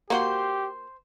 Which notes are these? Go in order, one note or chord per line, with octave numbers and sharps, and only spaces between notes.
A#3 F#4 G4 C5 C6